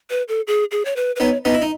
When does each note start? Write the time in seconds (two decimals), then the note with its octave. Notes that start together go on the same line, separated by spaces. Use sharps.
0.10 B4
0.28 A4
0.47 G#4
0.71 G#4
0.85 C#5
0.96 B4
1.16 B4
1.20 B3 D#4 C#5
1.45 B3 D#4 D#5
1.54 E4
1.62 D#4